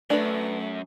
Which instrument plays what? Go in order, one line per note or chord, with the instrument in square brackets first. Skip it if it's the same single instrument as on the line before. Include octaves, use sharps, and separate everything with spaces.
[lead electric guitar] F#2 [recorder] A3 [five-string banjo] D4 B4